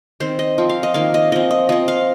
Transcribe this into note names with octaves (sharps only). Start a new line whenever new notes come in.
D#3 C4 C5
D#5
F3 C4
F5
D#5
D#3 A#3 F5
D#5
F3 C4 D#5
D#5
F3 C4 D#5
F5